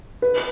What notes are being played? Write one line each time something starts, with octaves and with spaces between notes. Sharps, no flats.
B4